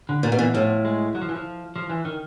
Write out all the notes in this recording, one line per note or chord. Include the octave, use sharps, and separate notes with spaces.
D3
A#2 D#3
B2
A#2 E3
A2 F3
G#3
F#3
F3
E3
F3
F3
E3
D#3